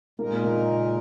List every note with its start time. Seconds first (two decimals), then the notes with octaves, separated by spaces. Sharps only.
0.19 A#2 G#3 A#3 D#4 A#4
0.44 A#3